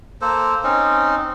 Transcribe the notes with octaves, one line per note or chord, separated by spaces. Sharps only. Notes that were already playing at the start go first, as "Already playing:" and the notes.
A#3 A4 C5
C4 C#4 D#4